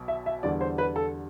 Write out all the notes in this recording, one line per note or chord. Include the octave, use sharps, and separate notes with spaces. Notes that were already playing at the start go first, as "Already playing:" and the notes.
Already playing: B1 B2 F#3
E5
E5
E2 D3 G3 D5
C5
B4
A4